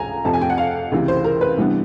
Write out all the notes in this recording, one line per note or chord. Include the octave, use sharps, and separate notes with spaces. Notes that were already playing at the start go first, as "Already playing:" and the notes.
Already playing: C#2 C3 F3 G#5 A#5
F2 C3 F3 A5
G#5
G5
F#5
F5
C#2 C3 E3
C5
A#4
B4
C3 E3 G3 B3 D4